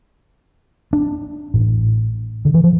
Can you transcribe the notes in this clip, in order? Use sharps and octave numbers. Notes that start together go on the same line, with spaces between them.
D4
A1 A2
D3
E3
F3